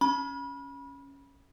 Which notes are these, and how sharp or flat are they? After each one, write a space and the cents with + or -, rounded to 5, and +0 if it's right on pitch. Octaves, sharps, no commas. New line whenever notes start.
C#4 +0 B5 -25